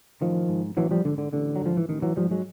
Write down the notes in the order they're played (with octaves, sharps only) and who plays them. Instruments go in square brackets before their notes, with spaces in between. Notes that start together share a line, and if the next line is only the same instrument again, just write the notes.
[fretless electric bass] A1 D#3 F3
G#2
A1 E3 F#3
F3 G3
G#2 D3
D3
A1 D3
F#3
G#2 F3
E3
A1 D#3
E3 F#3
G#2 F3 G3
F#3 G#3